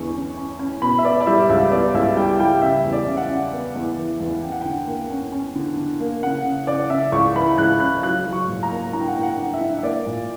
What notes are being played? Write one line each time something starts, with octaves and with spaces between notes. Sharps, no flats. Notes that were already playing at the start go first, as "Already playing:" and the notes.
Already playing: E2 D3 C#6
C#4
C#4
C#4
B2 B5
E5
B3 D5
D5
G3 E5
C#2 E5
B3 D5
C#2 E5
G3 G5
G3 G5
C#3 E5
E2
D5
C#3
F#5
E5
C#3
B3
E2
E3
E2
C#4 G5
F#5
D3 G5
A#3
C#4
C#4
D3
D3
A#3
C#3 F#5
C#3
C#3 D5
C#3 E5
C#2 C#6
E3 B5
C#2 F#6
C#3 F#6
F#3 F#6
F#3
C#6
A#2
A#5
A#3
D4 A#5
G5
F#5
A#3 G5
F#5
D4
E5
D4
E5
A#3 D5
A#2